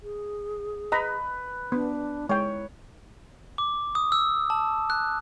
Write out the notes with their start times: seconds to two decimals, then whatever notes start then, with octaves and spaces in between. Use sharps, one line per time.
0.01 G#4
0.92 B4 D#5 A#5 B5
1.72 B3 D4
2.29 G#3 E4 C#5 G5
3.58 D6
3.95 D#6
4.12 E6
4.50 A5
4.90 F#6